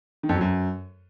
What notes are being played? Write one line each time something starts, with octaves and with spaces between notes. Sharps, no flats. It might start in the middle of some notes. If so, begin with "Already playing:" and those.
D#3
F2
F#3
F#2